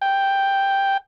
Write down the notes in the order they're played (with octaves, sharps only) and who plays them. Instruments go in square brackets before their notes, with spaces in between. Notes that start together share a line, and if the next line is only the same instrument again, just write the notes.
[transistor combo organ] G5